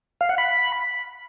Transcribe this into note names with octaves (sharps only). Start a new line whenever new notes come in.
F5
F#5
B5